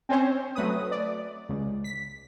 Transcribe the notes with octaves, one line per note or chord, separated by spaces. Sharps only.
C4 C#4 C5 C#5
F#3 A3 B4 D#6
D5
C#2
B6